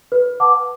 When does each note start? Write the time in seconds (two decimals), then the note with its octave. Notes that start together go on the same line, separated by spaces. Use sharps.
0.12 B4
0.40 F#5 A5 D6